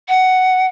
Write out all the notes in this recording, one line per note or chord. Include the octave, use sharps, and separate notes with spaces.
F#5